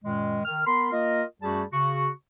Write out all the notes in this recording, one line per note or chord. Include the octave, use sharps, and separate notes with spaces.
F#2 A#2 D#3 G#3
D#3 F6
B3 A#4 B5 C6
A#3 F4 A#4 D#5
F#2 G3 A3 F#4 G#4 A5
C#3 F#4 C#6